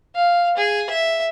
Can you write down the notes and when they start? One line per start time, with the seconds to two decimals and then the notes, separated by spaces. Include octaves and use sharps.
0.15 F5
0.57 G#4
0.90 E5